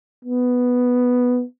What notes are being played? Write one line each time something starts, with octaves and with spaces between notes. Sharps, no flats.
B3